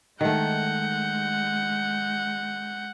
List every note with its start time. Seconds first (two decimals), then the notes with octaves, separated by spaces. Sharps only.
0.21 D#3 G#3 A3 F#5 G6